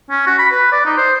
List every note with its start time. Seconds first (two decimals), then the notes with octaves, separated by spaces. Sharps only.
0.11 C#4
0.27 F#4
0.39 B5
0.51 B4
0.72 D5
0.85 D#4
0.97 C5